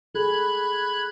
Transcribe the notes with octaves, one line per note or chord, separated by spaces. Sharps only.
G#4 A4 B5 F#6 G#6